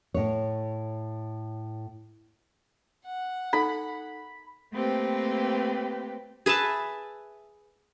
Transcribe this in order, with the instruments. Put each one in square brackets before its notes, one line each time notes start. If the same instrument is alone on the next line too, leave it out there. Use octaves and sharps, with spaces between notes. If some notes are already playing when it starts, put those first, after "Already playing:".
[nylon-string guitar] A2 C#5
[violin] F#5
[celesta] D#4 A4 [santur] B5
[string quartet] A3 A#3 C4 G4 B4
[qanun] G#4 B4 E5 A5